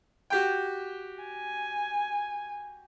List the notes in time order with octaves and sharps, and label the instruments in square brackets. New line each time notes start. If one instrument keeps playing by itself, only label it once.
[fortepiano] F#4 G4 G5
[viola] G#5